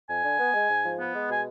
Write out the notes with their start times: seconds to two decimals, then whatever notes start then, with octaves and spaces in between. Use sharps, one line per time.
0.09 F2 G#5
0.24 D3
0.39 B3
0.54 G#3
0.70 G#2
0.84 F3
0.99 B3
1.14 G#3
1.29 B2 G#5